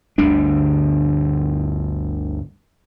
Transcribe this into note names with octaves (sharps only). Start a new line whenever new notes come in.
G1 D2 G3 D4